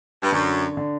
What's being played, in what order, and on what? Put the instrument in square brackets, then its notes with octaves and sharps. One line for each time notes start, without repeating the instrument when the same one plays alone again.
[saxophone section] G2
[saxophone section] F#2 [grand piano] D3
[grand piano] D3